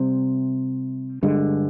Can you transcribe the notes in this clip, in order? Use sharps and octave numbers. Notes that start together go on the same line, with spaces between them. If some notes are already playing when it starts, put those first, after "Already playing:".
Already playing: C3 G3 C4
G2 D3 G#3